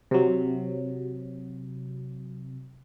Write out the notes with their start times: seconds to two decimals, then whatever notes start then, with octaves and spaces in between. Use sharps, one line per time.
0.11 C3 F#3